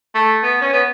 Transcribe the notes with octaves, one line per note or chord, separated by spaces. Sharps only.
A3
B3
C#4
B3